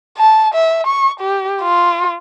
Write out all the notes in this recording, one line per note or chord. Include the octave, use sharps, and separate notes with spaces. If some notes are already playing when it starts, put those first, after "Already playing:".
A5
E5
C#6
G4
F4